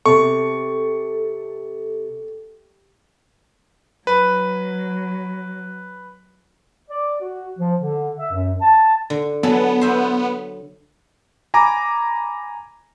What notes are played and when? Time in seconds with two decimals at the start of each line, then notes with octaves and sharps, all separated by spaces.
0.06 C3 A4 C#6
4.07 F#3 B4
6.90 D5
7.21 F#4
7.60 F3
7.81 D3
8.19 E5
8.32 F#2
8.62 A5
9.10 D3
9.43 F#3 B3 G#4 A4
9.81 C5 E5
11.54 G#5 A#5 B5 D6